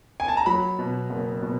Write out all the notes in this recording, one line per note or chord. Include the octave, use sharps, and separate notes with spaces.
G#5
A5
A#5
F#3 B5
B2
F#1
B2